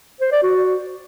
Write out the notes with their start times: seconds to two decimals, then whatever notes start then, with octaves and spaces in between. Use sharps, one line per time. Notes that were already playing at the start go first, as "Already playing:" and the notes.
0.21 C5
0.32 D5
0.43 F#4